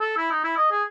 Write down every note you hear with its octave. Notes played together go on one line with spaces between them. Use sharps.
A4
E4
D#4
E4
D#5
G#4